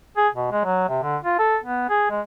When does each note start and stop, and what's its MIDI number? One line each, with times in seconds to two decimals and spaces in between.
0.17 0.28 68
0.35 0.51 47
0.52 0.62 56
0.65 0.86 54
0.89 0.99 48
1.03 1.17 50
1.23 1.38 65
1.39 1.57 69
1.64 1.88 59
1.89 2.07 68
2.10 2.21 56